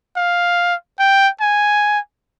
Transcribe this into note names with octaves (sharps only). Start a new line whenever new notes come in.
F5
G5
G#5